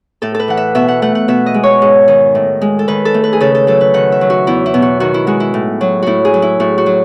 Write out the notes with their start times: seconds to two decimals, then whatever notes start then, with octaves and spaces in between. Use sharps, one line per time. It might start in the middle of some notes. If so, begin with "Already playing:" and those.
0.22 A2 A4
0.34 A4
0.40 B4
0.48 E3 F#5
0.57 E5
0.75 B2 E5
0.88 F#5
1.02 A3 F#5
1.15 F#5
1.28 B2 E5
1.46 D#5
1.54 G#3
1.63 C#5
1.82 G#2
2.08 D#3
2.35 A2
2.61 G#3
2.79 A4
2.88 D#3 B4
3.05 A4
3.14 A3
3.24 B4
3.33 G#4
3.40 C#3 A4
3.55 A4
3.67 F#3 A4
3.81 B4
3.94 D#3 F#5
4.12 E5
4.21 F#3
4.30 F#4
4.47 E2 E4
4.66 E4
4.74 B2
4.82 F#4
5.00 D#3 F#4
5.14 E4
5.27 G#3 F#4
5.40 E4
5.54 A2
5.81 F#3
6.02 A2 E4 F#4
6.25 G#4
6.34 F#3
6.42 E4
6.60 A2 F#4
6.78 F#4
6.86 F#3